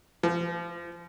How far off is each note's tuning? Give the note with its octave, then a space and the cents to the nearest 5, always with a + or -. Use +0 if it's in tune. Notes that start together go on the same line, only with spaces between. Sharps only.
F3 -30